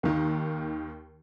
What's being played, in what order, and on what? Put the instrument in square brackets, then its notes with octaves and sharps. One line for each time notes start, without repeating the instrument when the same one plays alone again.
[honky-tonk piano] D#2 D#3